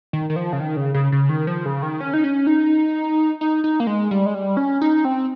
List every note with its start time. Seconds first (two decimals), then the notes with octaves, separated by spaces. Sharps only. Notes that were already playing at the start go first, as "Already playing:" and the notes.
0.13 D#3
0.30 D#3
0.36 F3
0.53 C#3
0.60 D#3
0.76 C#3
0.94 C#3
1.12 C#3
1.29 D#3
1.47 F3
1.65 C#3
1.83 D#3
2.01 C#4
2.14 D#4
2.24 C#4
2.47 D#4
3.41 D#4
3.64 D#4
3.80 A#3
3.87 G#3
4.11 G3
4.26 G#3
4.34 G3
4.57 C#4
4.81 D#4
5.05 C4